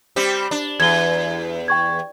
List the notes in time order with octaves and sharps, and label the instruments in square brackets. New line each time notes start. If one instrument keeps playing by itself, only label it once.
[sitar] G3 C4 G4
D4
[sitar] E2 [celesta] G#6 G7
[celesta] G5 C#6 G#6